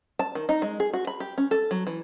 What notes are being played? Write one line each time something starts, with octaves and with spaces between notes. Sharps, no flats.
A5
D#3
D#4
G#3
G#4
F#4
B5
G4
C#4
A4
F#3
E3